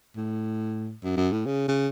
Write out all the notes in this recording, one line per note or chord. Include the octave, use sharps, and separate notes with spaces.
A2
F#2
F#2
A2
C#3
C#3